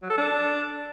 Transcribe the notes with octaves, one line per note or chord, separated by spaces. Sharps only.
F#3
A4
D4